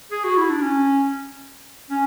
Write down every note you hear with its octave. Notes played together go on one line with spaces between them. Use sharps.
G#4
F#4
E4
D4
C#4
C#4